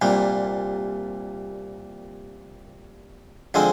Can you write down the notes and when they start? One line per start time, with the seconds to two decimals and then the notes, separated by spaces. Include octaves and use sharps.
0.02 C2 A#2 G3
3.54 D3 F3 G#3 C4